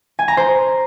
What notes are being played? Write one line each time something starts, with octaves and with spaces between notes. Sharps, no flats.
G#5
A#5
C5